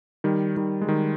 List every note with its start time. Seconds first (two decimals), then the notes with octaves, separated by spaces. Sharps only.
0.24 D#3 G3
0.57 D#3 G3
0.81 G#3
0.88 D#3 G3